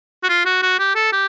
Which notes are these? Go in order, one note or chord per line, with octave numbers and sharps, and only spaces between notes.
F#4
F4
F#4
F#4
G4
A4
G4